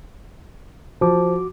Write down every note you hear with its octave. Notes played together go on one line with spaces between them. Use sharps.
F3 F#4 D6